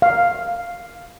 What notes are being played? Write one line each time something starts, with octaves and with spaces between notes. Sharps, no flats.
F5